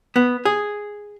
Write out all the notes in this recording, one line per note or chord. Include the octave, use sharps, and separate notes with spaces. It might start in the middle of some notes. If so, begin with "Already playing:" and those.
B3
G#4